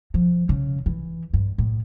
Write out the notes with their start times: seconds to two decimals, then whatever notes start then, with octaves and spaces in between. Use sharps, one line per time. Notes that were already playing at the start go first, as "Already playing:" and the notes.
0.14 F3
0.49 C#3
0.86 E3
1.34 G2
1.58 A2